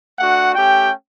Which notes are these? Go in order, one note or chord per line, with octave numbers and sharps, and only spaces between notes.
A3 D4 F#4 F#5
A3 C#4 G4 G5